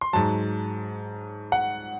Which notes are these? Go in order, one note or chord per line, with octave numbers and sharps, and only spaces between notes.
C6
G#2 F#3 A5
F#5